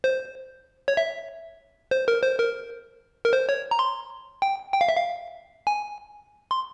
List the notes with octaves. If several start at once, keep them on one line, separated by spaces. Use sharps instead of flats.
C5
C#5
E5
C5
A#4
C5
A#4
A#4
C5
C#5
A#5
C6
G5
G5
F5
E5
F5
G#5
C6